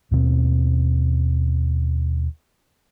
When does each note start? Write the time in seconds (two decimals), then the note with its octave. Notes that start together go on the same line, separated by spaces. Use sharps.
0.11 D#2 B2 G3 C4